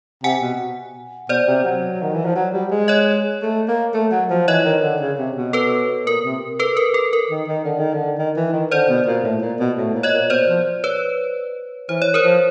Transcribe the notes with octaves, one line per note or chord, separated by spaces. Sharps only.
C3 F#5 G#5
B2
B2 C5 D5
C3
F#3
D#3
E3
F3
F#3
G3
G#3
C#5 D#5
A3
A#3
A3
F#3
F3
E3 C#5 D#5
D#3
D3
C#3
C3
B2
A4 B4
A#2 A#4
C3
A4 B4
A#4
A4
A#4
D#3
D#3
D3
D#3
D3
D#3
E3
D#3
D3 C5 D5
B2
A#2
A2
A#2
B2
A2
A#2
C#5 D#5
A#2
B2 C5 D5
F3
B4 C#5
E3 C5
C#5
A#4 C5
F3